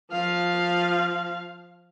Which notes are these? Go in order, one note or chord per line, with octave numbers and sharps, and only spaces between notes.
F3 F5